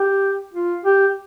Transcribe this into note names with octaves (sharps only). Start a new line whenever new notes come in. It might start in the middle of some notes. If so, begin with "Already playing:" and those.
Already playing: G4
F4
G4